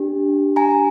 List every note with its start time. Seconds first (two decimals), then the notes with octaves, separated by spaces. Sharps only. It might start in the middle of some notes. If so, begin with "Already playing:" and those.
Already playing: D4 G4
0.56 G#5 A#5